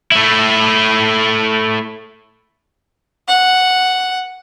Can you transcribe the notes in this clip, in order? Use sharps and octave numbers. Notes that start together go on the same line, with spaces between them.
A3 E4
F#5